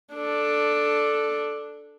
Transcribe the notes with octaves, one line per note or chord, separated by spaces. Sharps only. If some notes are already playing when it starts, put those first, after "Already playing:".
D4 A4